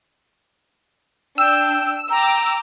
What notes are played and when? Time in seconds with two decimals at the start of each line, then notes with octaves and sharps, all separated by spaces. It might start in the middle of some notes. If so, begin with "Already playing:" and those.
1.38 D4 G5 E6
2.10 G5 A#5 D6